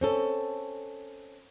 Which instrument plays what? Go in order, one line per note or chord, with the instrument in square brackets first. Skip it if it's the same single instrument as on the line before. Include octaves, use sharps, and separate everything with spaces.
[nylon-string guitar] C4 C#4 A4